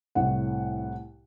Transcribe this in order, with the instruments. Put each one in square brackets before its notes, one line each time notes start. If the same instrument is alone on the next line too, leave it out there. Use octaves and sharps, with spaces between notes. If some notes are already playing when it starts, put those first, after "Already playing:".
[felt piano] C2 A2 F#5